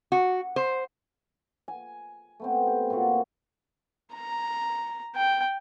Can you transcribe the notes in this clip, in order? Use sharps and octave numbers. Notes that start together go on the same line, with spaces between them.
F#4
C5
G#5
A3 B3 C4
G4
A#2 A#3 F4 F#4
A#5
G5